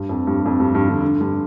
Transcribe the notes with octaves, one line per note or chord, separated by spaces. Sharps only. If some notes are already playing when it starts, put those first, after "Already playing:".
Already playing: G2
F2
G2
F2
G2
G2
D3
D3
G2